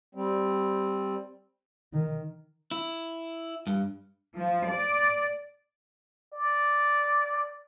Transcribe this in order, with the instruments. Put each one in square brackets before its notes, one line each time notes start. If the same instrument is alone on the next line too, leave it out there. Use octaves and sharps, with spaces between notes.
[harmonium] G3 C4
[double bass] D#3
[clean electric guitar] E4
G2
[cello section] F3
D5
[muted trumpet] D5